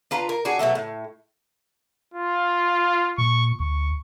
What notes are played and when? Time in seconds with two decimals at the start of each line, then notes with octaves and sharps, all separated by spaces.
0.11 D4 F4 B4 A#5
0.29 A#4
0.45 D4 F#4 G#4
0.59 B2 F#3 A3 A4
0.75 A2
2.14 F4
3.18 A#2 C#6
3.60 D2 C#6